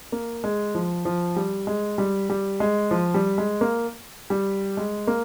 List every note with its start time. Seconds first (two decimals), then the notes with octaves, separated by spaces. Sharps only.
0.12 A#3
0.44 G#3
0.75 F3
1.05 F3
1.36 G3
1.67 G#3
1.98 G3
2.30 G3
2.60 G#3
2.91 F3
3.14 G3
3.38 G#3
3.61 A#3
4.30 G3
4.77 G#3
5.07 A#3